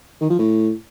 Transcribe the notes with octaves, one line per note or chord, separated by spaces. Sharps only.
D#3
F3
A2